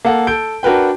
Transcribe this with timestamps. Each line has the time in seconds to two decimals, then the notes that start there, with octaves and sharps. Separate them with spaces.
0.05 A#3 A4 F#5
0.27 A4 G6 D7
0.63 D4 F#4 A#4 B4 G5